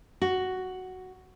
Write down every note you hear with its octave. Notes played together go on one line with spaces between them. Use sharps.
F#4